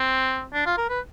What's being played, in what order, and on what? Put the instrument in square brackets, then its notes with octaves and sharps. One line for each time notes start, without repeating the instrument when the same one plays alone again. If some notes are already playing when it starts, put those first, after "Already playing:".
Already playing: [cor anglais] C4
D4
F4
A#4
B4